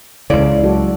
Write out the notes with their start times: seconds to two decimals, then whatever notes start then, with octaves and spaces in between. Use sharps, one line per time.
0.30 C#2 C#3 E4 G#4 D5 F5
0.63 F#3 F#4 A4